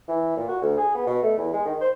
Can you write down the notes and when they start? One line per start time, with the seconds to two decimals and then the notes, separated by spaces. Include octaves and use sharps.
0.08 E3
0.37 A#2
0.49 F#4
0.62 D2
0.78 G#4
0.95 B3
1.06 B2
1.23 A3
1.37 E2
1.53 G#3
1.65 D#3
1.81 C5